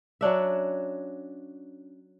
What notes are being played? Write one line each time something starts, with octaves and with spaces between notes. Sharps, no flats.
F#3 C#4 D4 E5